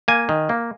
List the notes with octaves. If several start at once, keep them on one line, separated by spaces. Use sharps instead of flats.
A#3 G#5
D#3
A#3